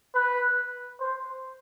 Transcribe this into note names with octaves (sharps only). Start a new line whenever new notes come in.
B4
C5